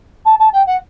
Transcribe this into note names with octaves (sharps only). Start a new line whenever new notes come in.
A5
A5
G5
F#5